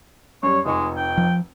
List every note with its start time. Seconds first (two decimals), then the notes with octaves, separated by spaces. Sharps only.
0.43 F#2 G3 C#5
0.66 F1 G#3 D#4 C#6
0.97 G5
1.17 F3